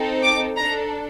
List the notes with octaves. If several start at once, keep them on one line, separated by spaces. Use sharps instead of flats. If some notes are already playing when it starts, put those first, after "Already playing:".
Already playing: C4 D#4 A4
D6
D4 A4 A#5